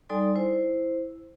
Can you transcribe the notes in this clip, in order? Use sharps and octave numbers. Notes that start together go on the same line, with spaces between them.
G3 D#4 A4 D5 G#5 C6
E4 C5